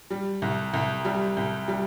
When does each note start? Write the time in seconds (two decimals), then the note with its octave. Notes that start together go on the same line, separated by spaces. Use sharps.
0.10 G3
0.42 C2
0.74 C2
1.05 G3
1.37 C2
1.68 G3